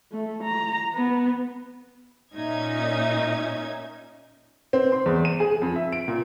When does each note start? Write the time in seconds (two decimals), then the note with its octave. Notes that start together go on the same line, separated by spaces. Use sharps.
0.12 A3
0.44 A#5
0.94 B3
2.35 A#2 C#4 D#4 E5 G#6
4.73 C4
4.92 C6
5.06 E2
5.25 D#7
5.40 G#4
5.62 F2
5.76 E5
5.93 D7
6.08 A#2